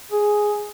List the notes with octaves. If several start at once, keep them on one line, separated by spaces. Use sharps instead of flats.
G#4